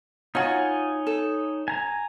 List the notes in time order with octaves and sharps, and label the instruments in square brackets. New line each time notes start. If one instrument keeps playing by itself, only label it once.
[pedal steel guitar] D#4 C#5 G#5 [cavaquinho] F4 F#4
[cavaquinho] A4
[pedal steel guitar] G#5 A#5